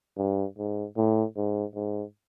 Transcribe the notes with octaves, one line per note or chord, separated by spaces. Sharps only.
G2
G#2
A2
G#2
G#2